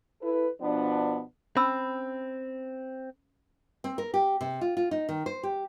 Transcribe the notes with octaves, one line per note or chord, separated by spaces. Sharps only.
E4 A4 B4
B2 F3 B3 D4
C4 C#4 B5 E6
C4
A#4
G4
C3
F4
F4
D#4
D#3
C5
G4